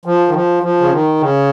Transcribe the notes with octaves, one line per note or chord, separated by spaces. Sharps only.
F3
D#3
F3
F3
C#3
D#3
C#3